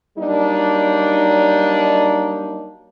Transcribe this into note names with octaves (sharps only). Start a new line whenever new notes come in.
F#3 G3 A#3 D4 D#4